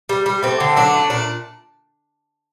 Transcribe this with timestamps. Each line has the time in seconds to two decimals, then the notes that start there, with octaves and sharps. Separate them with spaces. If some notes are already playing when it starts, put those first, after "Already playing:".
0.09 G3
0.26 G3
0.43 A3 C4
0.60 D3
0.76 F#3 D4
0.94 A3
1.10 A#2 D4